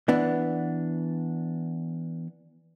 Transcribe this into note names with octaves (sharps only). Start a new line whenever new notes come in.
E3 B3 D4